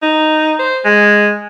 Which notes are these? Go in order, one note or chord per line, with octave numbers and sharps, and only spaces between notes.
D#4
C5
G#3